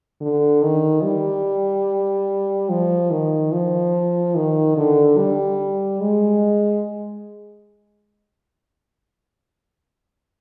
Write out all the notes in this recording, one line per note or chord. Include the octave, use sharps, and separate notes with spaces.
D3
D#3
G3
F3
D#3
F3
D#3
D3
G3
G#3